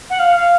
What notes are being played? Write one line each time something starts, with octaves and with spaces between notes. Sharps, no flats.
F#5
F5
F5